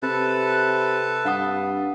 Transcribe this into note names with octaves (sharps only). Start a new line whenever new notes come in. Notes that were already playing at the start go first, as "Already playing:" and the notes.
C3 A4 B4 A5
G2 F5 F#5 D#6